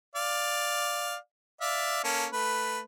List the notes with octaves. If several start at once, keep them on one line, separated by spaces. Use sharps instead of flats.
D5 F5
D5 E5 F5
A#3 C#4 A4
A3 B4